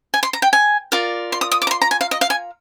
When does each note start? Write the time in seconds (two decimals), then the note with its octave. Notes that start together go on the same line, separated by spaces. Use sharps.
0.14 G#5
0.23 C6
0.33 A#5
0.42 G5
0.53 G#5
0.92 F4 A#4 D5
1.32 C6
1.41 D#6
1.52 D#6
1.62 D6
1.67 A#5
1.71 C6
1.82 A#5
1.91 G#5
2.01 F5
2.11 D#5
2.21 F5
2.30 G#5